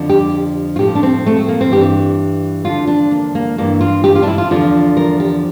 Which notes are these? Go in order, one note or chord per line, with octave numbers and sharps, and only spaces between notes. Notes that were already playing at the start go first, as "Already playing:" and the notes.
Already playing: F2 D3 F3
G4
F4
A2 F3 G4
D4
C4
A3
C4
A#3
C4
G2 E3 G4
E2 D3 F3 F4
D4
A#3
A#3
G2 E3 A#3
F4
G4
F4
D4
E4
F4
E2 D3 F3 F4
A#4
G4